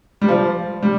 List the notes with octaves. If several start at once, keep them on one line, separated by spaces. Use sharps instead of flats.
G3
F3
G3